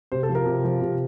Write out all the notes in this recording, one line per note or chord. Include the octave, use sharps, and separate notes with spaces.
C3 C5
A4
F3
A#4
C3
F3
C3